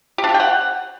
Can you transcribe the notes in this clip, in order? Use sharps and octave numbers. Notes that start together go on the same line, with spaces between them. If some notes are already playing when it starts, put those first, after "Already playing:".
G4
D4
G4
G5
F#5